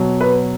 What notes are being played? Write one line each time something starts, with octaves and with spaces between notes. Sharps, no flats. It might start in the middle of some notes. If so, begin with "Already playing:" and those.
Already playing: B2 F#3
B4